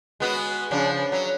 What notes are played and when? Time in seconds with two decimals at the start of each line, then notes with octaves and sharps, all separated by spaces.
0.20 G#3 B3 F#4
0.71 C#3 F3 D4
1.12 F#3